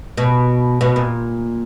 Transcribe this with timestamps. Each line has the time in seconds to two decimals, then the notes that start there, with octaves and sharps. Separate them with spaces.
0.17 B2
0.81 B2
0.96 A#2